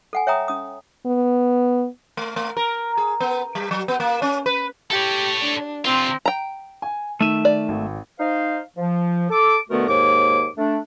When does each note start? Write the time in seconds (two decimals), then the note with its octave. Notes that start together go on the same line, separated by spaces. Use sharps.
0.13 A4 F#5 G#5
0.27 C#5 E5 G5 A#5 D#6
0.48 C#4 D#6
1.06 B3
2.17 A3
2.36 A3
2.57 A#4
2.97 G#4
3.20 B3
3.55 G3
3.71 F#3
3.88 B3
4.00 A#3
4.22 C#4
4.46 B4
4.91 G4 A4 C#5
5.40 D4
5.85 C3 C4 F4
6.26 G5 A#5
6.82 G#5
7.21 D#3 A3 E5 D#7
7.45 D5
7.69 G#1
8.19 D#4 C5 F5
8.77 F3
9.30 A4 D6
9.70 B2 D3 A3 B3 F#4 A#4
9.88 D#2 G#2 A#3 C#5 D6
10.57 A3 D4